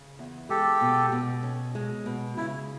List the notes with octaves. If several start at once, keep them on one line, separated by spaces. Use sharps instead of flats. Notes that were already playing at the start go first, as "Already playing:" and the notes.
Already playing: C#3
E2
G#3 G4 A4
B2
B2
C#4
G#3
B2
C#3 E4